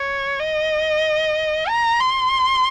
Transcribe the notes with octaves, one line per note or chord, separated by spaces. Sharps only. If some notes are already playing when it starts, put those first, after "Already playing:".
Already playing: C#5
D#5
A#5
C6